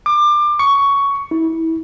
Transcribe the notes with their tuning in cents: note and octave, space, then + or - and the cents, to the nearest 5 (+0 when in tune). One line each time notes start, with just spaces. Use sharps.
D6 +25
C#6 +10
E4 -25